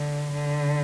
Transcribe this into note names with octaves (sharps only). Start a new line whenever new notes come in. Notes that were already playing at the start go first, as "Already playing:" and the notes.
Already playing: D3
D3